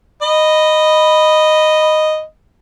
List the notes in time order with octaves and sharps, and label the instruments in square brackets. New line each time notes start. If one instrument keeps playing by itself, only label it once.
[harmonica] D#5 B5